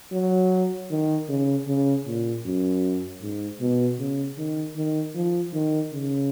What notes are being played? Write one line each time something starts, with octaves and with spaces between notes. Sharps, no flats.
F#3
D#3
C#3
C#3
A#2
F#2
G#2
B2
C#3
D#3
D#3
F3
D#3
C#3